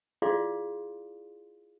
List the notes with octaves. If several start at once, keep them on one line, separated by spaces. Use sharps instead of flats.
E4 F4 G#4 D5 F5 C6